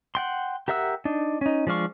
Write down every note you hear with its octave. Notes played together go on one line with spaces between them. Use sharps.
F#5 G5 C6
G4 A#4 E5 F#5 E6
D4 D#4
C#4 D#4
F3 G#3 D4 F5 C#6